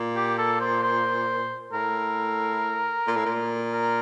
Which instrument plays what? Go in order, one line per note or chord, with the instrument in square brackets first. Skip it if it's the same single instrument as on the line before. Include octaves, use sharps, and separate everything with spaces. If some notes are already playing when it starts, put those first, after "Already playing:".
Already playing: [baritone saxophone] A#2
[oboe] G4
A4
C5
C5
[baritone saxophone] A2 [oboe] A#4
[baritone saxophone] A#2
A2
A#2
[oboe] A#4